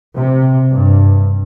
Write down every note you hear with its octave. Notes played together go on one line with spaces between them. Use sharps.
C3
G2